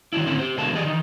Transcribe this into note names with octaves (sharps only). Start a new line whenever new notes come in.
D#3 F#3 D4 E4
A2 D3 C4 C#4 E4
G4 C5
B2 D3 G#3 A#3 A5
E3 F3 G4 G#4 D5 D#5
D#3 E3 D#4